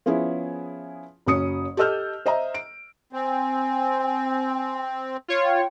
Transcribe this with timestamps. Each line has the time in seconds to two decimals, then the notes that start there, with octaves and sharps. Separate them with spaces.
0.06 F3 B3 C#4 E4 G#4
1.26 F#1 F#3 C#4 D#6 C#7
1.77 G4 A4 D#5 E6 F6 G6
2.26 C5 D#5 E5 A#5
2.54 D7
3.13 C4 G#5
5.28 F4 C#5
5.44 G5